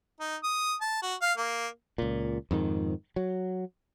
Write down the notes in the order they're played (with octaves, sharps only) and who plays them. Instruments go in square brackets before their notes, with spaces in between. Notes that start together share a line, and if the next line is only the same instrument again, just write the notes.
[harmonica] D#4
D#6
A5
F#4
F5
A#3
[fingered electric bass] C#2 A#2
F2 G#2 D#3
F#3